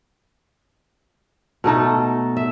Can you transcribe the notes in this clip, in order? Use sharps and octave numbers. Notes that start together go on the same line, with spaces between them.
B2 A3 D#4 A4
E5